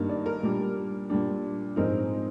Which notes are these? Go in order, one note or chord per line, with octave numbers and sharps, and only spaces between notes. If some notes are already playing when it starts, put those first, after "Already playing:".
Already playing: G2 D#3 A#3
D5
A#4
A#2 G3 D4
A#2 G3 D4
G#2 F3 G#3 C4 D#4 A#4